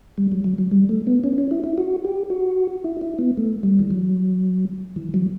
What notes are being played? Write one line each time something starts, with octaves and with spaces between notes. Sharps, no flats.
G3
F#3
F#3
F#3
G3
A3
B3
C#4
C#4
E4
E4
F#4
G4
F#4
E4
E4
B3
A3
G3
E3
F#3
E3
F#3